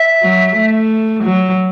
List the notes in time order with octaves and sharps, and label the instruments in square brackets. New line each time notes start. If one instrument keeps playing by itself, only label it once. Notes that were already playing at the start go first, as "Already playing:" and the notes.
Already playing: [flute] E5
[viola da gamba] F#3
A3
F#3